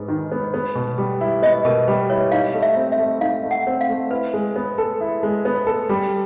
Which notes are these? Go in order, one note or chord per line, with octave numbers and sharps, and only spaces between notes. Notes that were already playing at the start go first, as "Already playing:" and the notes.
Already playing: G#2 B3
D#3
B3
B3
B2
G3
E4
B3 D#5
B2 A#4
G3 B4
E4 C#5
D#4 F5
A3
E5
C4
E5
A3
D#4 F5
A3
F#5
C4
F5
A3
E4 B4
G#3
B3
A4
E4
G#3
B3
A4
G3